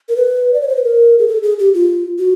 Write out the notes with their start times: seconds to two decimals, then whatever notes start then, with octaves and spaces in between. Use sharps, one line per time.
0.09 A#4
0.16 B4
0.54 D5
0.62 C#5
0.68 C5
0.76 B4
0.84 A#4
1.19 G#4
1.28 A4
1.43 G#4
1.59 G4
1.74 F4
2.19 F#4